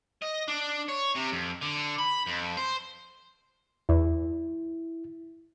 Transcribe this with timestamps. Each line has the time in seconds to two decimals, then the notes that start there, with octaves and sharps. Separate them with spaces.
0.22 D#5
0.48 D4
0.89 C#5
1.15 C3
1.32 F2
1.61 D3
1.99 B5
2.27 F2
2.57 C5
3.89 E2 E4